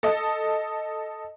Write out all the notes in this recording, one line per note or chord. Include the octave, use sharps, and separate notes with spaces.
A4 D#5